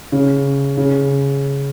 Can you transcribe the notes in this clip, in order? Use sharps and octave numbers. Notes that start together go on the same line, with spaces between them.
C#3
C#3